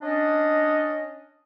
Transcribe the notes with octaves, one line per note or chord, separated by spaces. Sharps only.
C#4 D4 D#5